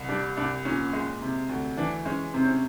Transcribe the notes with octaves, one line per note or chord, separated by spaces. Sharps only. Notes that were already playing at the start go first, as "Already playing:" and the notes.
Already playing: C2
G3 D4
C2 D4
A#2 C#4
G#3
C3
D2
E3 D4
G#3 C#4
C3 C4
C#4